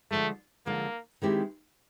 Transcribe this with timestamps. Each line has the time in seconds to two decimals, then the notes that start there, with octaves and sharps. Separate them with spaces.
0.11 D3 F3 G#3 A3
0.66 D3 F3 G#3 A#3
1.22 D#3 G#3 C4 E4 G4